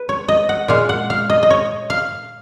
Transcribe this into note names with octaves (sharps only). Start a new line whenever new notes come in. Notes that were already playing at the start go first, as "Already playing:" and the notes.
Already playing: B4
C#5
D#5
F#5
A#2 G#3 F5
F#5
F5
D#5
D#5
C#5
F5